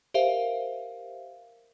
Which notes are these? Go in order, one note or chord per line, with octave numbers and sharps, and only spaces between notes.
G4 A#4 C5 E5 F5